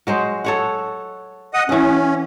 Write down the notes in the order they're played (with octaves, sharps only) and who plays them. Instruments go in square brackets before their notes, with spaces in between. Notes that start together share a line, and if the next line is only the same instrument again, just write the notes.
[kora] F#3 G#3 C5
A4 C#5 F#5
[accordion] D#5 F#5 D#6
[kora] E3 F#5 [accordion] C#4